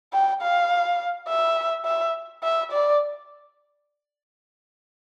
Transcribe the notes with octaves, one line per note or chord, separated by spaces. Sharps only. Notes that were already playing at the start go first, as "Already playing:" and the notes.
G5
F5
E5
E5
E5
D5